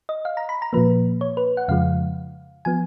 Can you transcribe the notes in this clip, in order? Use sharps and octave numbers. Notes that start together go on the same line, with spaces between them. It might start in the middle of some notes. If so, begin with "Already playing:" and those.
D#5
F5
A#5
B5
A#5
A#2 F3 A#3 B4
C#5
B4
F#5
F2 C#3 F3 G#3 F5
F3 B3 G#5